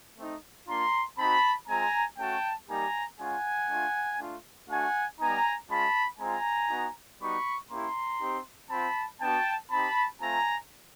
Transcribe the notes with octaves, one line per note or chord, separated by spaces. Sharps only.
A3 C4 D#4
A#3 D4 F4 A#5 C6
C4 D#4 F#4 A5 B5
G#3 C4 F4 G#5 A#5
A3 C#4 F#4 G5 A5
G3 A#3 D#4 G4 G#5 A#5
G#3 C#4 F4 F#5 G#5
A3 D4 F4
A3 D4 F4
A3 D4 F#4 F#5 G#5
G3 B3 D#4 G#5 A#5
G#3 C#4 F4 A5 B5
G#3 C4 F4 G#5 A#5
B3 D#4 F#4
G3 B3 D#4 F#4 B5 C#6
A#3 C#4 E4 G4 A#5 C6
C4 D#4 G4
C4 F4 A5 B5
B3 D4 F#4 G5 A5
C4 D#4 G4 A5 B5
A3 C4 F4 G#5 A#5